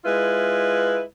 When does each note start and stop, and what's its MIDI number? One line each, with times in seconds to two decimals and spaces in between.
0.05 1.00 56
0.05 1.00 64
0.05 1.00 65
0.05 1.00 71